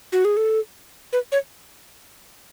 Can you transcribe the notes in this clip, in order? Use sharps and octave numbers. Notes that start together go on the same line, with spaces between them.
F#4
G#4
A4
B4
C#5